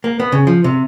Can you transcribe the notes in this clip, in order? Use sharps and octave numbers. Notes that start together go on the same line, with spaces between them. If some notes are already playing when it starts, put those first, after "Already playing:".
A#3
B3
C#3
F3
C3